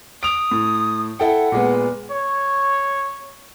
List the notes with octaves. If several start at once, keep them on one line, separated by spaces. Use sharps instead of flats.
D#6 D7 F7
A2
E4 A4 F#5 G5
A#2 G#3 B3
C#5